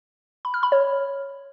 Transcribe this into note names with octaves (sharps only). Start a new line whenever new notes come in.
B5
F6
B5
C#5